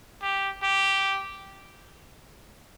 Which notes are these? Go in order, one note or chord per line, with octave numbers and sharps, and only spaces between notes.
G4
G4